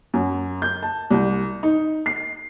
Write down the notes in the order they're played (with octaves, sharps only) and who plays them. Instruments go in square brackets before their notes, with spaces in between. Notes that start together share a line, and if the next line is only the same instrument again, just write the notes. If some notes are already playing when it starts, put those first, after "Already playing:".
[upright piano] F#2
G6
A5
C2
D#4
C7